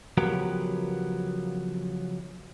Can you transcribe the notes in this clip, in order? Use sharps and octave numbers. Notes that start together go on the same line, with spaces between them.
C#3 F3 F#3 B3 G4 A#4